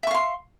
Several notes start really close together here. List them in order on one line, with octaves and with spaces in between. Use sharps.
E5 C#6 F5 C6